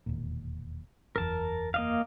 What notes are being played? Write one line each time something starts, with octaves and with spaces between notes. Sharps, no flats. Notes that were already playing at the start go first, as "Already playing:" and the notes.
E1 D#2 A#2
F#1 E2 A#4 A5
A#3 D#5 F5